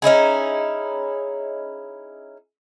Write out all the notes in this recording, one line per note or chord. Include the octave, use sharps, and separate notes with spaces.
C#4 D#4 E4 G#4